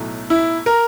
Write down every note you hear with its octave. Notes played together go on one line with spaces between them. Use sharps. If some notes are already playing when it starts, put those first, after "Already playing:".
Already playing: B1 A2 F#3 A3
E4
A#4